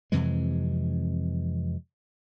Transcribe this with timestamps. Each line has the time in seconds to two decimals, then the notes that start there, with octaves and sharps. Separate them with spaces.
0.12 F2 C3 E3 G#3